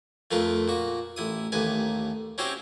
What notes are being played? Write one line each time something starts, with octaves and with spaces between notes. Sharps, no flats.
F2 A3 F4 A#4 B4
A#2 F#4
A1 E4 D#6
A1 D#2 A2 B4 G#5
C4 C#4 E4 F#4 G4 C5